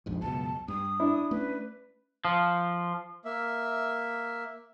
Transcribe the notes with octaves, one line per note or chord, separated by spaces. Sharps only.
A#1 F2 G#2
C#2 F#2 B2 A5
G2 D#6
D4 E4
A3 C#4 B4
F3
A#3 E5